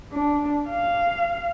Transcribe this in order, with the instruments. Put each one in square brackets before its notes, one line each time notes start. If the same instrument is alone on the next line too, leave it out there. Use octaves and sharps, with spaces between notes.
[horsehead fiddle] D4
F5